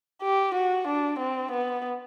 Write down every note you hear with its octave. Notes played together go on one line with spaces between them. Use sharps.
G4
F#4
D4
C4
B3